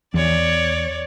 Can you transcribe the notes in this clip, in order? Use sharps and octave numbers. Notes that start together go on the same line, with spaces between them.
E2 C#5 D5